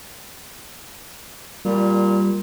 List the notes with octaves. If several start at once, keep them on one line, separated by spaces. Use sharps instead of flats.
A#2 G3